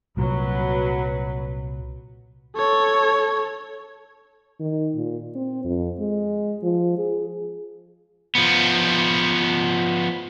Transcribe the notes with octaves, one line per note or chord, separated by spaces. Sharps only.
C2 A#2 F#3 B4
A4 C#5
D#3
A#2
C4
F2
G#3
F3
G#4
F3 B3